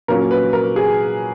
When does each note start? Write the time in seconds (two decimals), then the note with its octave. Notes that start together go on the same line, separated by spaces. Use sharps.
0.08 A#2 F#3 A#3 C#4 A#4
0.31 B4
0.53 A#4
0.76 G#4